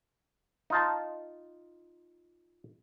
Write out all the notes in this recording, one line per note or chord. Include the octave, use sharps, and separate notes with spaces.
D#4 F4 A5